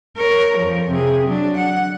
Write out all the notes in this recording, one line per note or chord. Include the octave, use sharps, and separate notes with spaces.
A#4 C#5
F2 F3
C3 G#4
F#3 D4
F#5